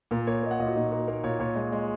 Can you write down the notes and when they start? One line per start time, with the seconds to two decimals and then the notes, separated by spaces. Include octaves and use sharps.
0.11 A#2 A#4
0.27 A#3 C#5
0.43 A#3 D#5
0.51 F#5
0.60 A#2 D#5
0.67 F#4
0.75 A#2 D#4
0.91 A#3 F#4
1.08 A#3 A#4
1.24 A#2 C#5
1.39 A#2 C#5
1.55 G#3
1.72 G#3